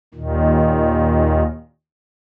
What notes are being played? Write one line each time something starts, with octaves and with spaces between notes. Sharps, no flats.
D#2 A#2 D#3